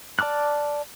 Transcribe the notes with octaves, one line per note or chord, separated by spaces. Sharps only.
D5 A5 D6 F6 F#6